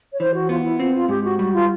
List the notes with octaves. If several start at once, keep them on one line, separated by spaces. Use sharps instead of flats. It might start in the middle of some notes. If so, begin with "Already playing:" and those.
C#5
E3 C5
F#4
B3 F4
F4
E4
C4 F4
F4
G#2 G4
F#4
G3 F#4
F4